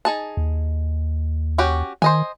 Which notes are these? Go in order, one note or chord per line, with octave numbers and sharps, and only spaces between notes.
D#4 G#4 A5
D#2
C#4 F#4 G4
D#3 C5 D#5 G#5